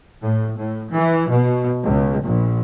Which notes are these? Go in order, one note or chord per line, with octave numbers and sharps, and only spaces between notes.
A2
A2
E3
B2
C#2
A#1